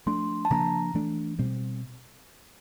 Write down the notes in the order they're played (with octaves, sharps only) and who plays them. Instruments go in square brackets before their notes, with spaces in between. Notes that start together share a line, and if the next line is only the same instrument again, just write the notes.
[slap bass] F3 A3 D4 [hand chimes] C6
[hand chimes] A5
[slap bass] C#3 F3 A#3 D4 [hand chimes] A#5
[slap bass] E3 A3 D4
B2 G3 C4